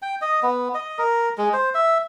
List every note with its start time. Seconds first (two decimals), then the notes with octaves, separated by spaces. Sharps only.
0.02 G5
0.21 D#5
0.43 B3
0.74 D#5
0.99 A#4
1.38 G#3
1.53 C5
1.74 E5